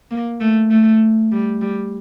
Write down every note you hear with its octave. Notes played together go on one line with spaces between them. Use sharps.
A#3
A3
A3
G3
G3